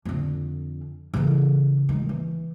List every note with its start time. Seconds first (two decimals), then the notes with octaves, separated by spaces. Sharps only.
0.05 F2 D3
1.14 C#3 E3
1.89 D#3 G#3
2.09 E3